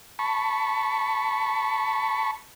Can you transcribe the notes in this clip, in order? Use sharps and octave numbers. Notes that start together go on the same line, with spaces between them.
A5 B5 C#6